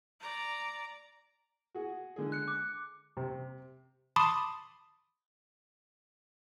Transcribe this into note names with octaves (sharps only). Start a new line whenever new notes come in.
D5 A#5
F#4 G#4
D3 G#3 G#4
F#6 C#7
D6
C3
A5 B5 C6 D6 D#6